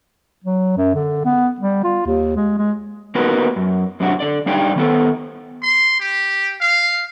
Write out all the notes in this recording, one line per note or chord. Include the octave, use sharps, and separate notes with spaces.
F#3
F#2
D3
B3
G3
F4
D#2
G#3
G#3
A#3 B3 D#4 F#4 A#4 B4
F#2
F#2 C3 F#3 D4 F#4
D3 D5
G3 D4 D#4 D5 F5 G5
D#3 B3 A4
C6
G4
F5